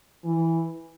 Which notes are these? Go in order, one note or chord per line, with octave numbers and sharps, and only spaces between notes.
E3